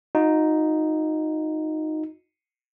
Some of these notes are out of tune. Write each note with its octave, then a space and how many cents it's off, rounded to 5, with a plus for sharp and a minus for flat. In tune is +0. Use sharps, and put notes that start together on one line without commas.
D#4 +0 F#4 -45